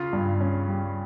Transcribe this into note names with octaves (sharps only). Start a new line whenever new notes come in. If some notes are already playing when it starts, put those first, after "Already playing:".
Already playing: C#3 F4
G2
C#4
G3